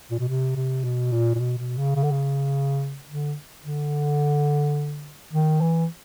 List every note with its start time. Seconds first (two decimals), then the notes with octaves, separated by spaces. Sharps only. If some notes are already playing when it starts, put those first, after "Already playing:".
0.11 A#2
0.19 B2
0.28 C3
0.56 C3
0.84 B2
1.12 A#2
1.35 A#2
1.40 B2
1.58 B2
1.77 C#3
1.96 C#3
2.03 D3
2.11 C#3
3.09 D3
3.65 D3
5.33 D#3
5.61 E3